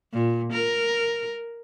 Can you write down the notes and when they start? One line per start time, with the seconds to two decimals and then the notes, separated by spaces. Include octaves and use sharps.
0.13 A#2
0.53 A#4